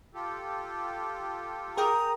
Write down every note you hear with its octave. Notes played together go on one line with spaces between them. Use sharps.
F4 G4 A4
G#4 A#4 G5 A#5 D#6